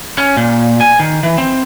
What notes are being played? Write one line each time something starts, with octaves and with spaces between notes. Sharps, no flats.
C#4
A#2
G#5
D#3
E3
C4